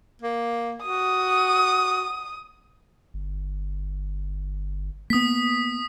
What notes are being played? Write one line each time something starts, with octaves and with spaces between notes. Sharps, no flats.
A#3
F#4 D#6
G1
A#3 B3 D#6 B6